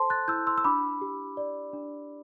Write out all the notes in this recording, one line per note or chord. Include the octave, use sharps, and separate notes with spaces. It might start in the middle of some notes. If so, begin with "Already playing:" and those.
Already playing: A4 C5 A5 C6
F#6 A6
E4 E6 G6
C6 E6
E6
D4 B5 D6
G4
D5
D4